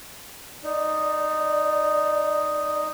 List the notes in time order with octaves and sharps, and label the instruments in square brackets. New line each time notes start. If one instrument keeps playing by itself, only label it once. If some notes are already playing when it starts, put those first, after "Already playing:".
[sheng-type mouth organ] D#4 [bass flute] D5